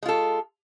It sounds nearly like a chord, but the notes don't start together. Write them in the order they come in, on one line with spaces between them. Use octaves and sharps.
G#3 F4 A4